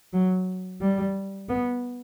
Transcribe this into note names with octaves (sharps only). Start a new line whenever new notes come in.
F#3
G3
B3